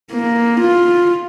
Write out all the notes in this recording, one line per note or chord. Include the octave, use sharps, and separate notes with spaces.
A#3
F4